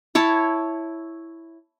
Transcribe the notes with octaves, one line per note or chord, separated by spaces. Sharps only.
E4 C#5 A5